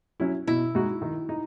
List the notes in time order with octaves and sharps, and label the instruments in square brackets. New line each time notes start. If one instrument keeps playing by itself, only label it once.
[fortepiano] F#3 C#4 E4
[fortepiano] B2 [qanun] E4
[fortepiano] G#3 D#4 F#4
D#3
D#4